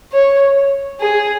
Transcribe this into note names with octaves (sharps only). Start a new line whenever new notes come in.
C#5
G#4